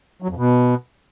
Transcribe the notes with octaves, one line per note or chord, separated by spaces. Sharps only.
F#3
F2
B2